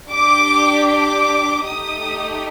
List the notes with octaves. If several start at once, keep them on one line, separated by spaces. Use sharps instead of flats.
D4 G4 D6
D6
A3 D#4 G4 D#6